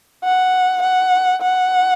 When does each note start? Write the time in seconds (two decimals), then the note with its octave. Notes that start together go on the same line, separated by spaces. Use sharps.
0.24 F#5
0.83 F#5
1.42 F#5